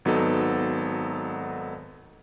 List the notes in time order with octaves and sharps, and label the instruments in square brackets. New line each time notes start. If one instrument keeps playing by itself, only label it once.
[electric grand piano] G#1 F#3 B3 D#4 A4